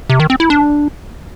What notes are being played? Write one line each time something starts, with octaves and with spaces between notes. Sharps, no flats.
C3
D#3
C4
E4
D4